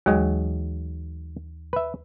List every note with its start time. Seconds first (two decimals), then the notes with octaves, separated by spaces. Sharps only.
0.06 D#2 E3 F#3 G#3
1.73 B4 E5